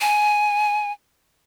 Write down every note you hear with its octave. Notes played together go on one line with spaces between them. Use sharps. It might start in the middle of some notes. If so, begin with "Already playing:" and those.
G#5